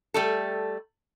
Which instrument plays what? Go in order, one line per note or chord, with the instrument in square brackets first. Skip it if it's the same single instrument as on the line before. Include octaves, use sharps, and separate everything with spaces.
[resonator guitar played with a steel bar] G3 A3 A4